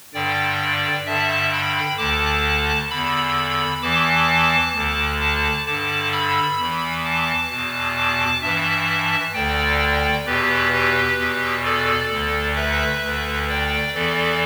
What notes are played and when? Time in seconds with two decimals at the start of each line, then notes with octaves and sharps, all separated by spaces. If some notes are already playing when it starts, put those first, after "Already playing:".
0.14 G2 D3 D5 G5
1.06 G2 D3 E5 A5
1.52 G5 B5
1.98 D2 D3 A5 D6
2.90 E2 D3 B5 E6
3.82 E2 E3 A5 D6
4.74 D2 D3
5.20 A5 D6
5.66 G2 D3 A5 D6
6.12 B5 E6
6.59 E2 E3
7.04 A5 D6
7.51 E2 B2
7.96 A5 D6
8.42 G2 E3 E5 A5
9.34 D2 D3 D5 G5
10.26 E2 B2 G4 B4
10.73 G4 B4
11.18 E2 B2
11.64 A4 D5
12.11 D2 D3
12.56 B4 E5
13.02 D2 D3
13.49 D5 G5
13.94 E2 E3 A4 D5